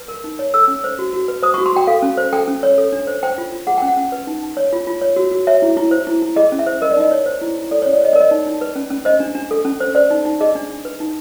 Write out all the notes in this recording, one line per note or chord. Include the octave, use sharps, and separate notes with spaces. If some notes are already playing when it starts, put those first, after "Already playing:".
Already playing: B4
A#4
D#4
C#5
A4 E6
C#4
C5
F#4
F#4
B4
C5 D#6
F#4 C#6
C6
F#4 G5
A4 F5
C#4
C5
A4 G5
C#4
C#5
A4
D4
C5
C5 G5
F4
F4
G#4 F#5
C#4 G5
F#5
C#4
B4
D#4
D#4
C#5
F4
F4
C#5
F#4
F#4
C#5 E5
E4
E4
C5
E4
E4
G#4 D#5
C#4
E5
C5
A#4 D#5
D5
D#4 D#5
C#5
C5
E4
E4
A4 D5
C#4 C#5
D5
C#5 D#5
A#4 D5
D#5
D#4
D#4
B4
C#4
C#4
C5 D#5
D4
D4
A4
C#4
C5
C5 D5
D#4
D#4
G#4 D#5
D4
D4
B4
D#4